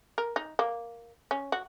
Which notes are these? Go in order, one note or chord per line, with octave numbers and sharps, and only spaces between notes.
A#4
D#4
A#3
C#4
F#4